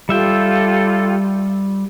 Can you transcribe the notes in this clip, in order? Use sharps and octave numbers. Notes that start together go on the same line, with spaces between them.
G3 F4 G4 A4 E5 G5